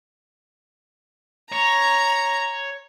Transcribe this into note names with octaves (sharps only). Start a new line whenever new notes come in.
C#5 A#5